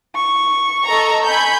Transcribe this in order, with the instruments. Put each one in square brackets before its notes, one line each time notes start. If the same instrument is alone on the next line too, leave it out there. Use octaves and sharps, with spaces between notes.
[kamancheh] C#6
[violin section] A4 D#5 A#5
G#5 B5 G6